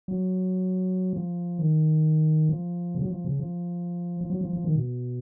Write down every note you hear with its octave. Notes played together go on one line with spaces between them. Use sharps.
F#3
F3
D#3
F3
C#3
F#3
F3
C#3
F3
F3
F#3
F3
F3
D#3
B2